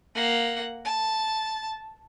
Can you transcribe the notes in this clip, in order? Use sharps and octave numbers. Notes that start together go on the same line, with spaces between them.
A#3 F#5
A5